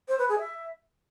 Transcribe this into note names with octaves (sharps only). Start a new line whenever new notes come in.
C5
B4
G#4
E5